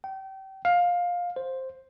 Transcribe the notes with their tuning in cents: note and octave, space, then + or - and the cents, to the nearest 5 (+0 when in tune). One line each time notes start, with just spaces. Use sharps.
G5 -30
F5 +15
C5 +5